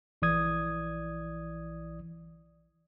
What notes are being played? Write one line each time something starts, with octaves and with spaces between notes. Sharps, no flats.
A#1 E3 D5 D#6 G#6